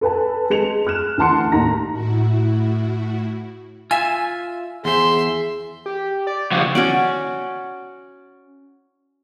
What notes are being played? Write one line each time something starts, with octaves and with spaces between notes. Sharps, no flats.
A4 B4 G#5 A5
G#3 C#7 F7
F6 F#6 E7
D2 E3 F#5 A5 C6 C#7
D#2 A2 D#4 A#5 A#6
A2 E4 F#4
F4 E5 G#5
E2 G#4 C5 E5 C6
G4
D5
F2 C#3 F#4
C#4 F#4 D5